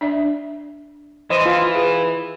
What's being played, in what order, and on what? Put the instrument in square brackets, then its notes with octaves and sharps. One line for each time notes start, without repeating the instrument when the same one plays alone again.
[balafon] D4 D5 E5
[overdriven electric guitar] E3 [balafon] C5 C6 [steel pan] D#5
[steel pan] F4
[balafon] G#4 B4